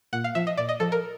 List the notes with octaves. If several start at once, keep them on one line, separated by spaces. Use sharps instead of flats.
A#2 F#5
F5
F3 E5
D#5
A#2 D5
D#5
F3 A4
A#4